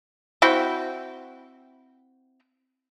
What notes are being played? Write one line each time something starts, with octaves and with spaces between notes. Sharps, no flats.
C4 E4 F#4 G5